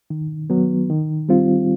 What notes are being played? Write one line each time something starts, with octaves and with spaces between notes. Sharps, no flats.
D#3
F#3 B3
D#3
G3 C4 F4